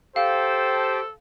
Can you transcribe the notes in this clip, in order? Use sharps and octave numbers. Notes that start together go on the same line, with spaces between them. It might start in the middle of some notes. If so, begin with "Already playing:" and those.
G4 A4 C5 F5 G5 A5